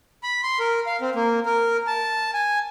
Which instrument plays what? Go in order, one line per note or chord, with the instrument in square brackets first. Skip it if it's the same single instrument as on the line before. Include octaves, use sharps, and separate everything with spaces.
[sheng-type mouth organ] B5
C6
A#4
F5
C4
A#3
A#4
A5
G#5